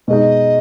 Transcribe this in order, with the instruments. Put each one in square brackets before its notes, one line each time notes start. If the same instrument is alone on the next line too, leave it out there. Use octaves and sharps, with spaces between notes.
[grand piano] B2 G#3 D#4 [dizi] D#5